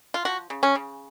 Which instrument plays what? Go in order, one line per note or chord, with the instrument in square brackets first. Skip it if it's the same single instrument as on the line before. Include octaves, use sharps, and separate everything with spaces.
[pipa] F4
F3 F#4
C#3
C#4
C#3